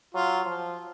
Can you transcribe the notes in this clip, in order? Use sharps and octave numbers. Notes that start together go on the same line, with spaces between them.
F#3 F4
F3